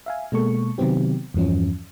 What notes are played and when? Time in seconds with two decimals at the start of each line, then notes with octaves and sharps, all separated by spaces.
0.06 E5 F5 G#5
0.32 B2 G#3 A#3 A4 C#6
0.78 C3 D#3 F#3 B3 C4 G4
1.34 E2 G2 E3 F3 C#4